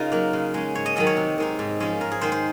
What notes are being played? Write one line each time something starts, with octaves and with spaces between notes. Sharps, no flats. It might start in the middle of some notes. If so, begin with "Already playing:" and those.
Already playing: C#3 D#4 F4 A#4
F#3 A#3
C#3
G#3 C#4
G#2 C#5
D#5
D#3 F#3 C#4 D#5
C#5
C3
D#3 G#3 D#4
G#2
F3 G#3 C#4
G#2 A#4
G#4
D#3 G#3 D#4 C5
C5